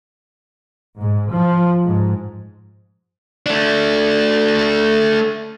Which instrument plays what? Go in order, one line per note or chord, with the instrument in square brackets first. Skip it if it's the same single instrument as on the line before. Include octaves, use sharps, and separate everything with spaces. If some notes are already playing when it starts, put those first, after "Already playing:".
[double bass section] G#2
F3
G#2
[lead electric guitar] A3 D4